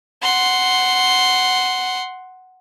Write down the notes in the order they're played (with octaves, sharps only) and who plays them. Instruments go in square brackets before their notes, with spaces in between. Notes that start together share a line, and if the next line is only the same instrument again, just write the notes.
[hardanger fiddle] F#5 C6